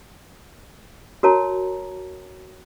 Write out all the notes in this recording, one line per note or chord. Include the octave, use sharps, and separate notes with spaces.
F#4 A#4 C#5 A5 A#5